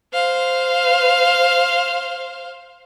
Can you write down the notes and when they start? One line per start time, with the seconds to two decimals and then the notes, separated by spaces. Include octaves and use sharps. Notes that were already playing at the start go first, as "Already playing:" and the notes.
0.13 C5 F5